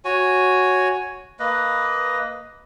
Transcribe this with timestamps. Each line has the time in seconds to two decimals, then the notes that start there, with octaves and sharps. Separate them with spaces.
0.05 F#4 C#5 G#5
1.39 A#3 B4 D#5